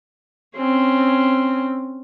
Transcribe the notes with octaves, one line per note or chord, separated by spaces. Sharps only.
C4 C#4